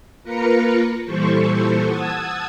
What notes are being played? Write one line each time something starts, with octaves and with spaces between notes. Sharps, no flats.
A#3 F4 A#4 B4 A#5 C#7
A#2 E3 G3 A4 C5 C#6
F#5 A5 D#6 E6 G#6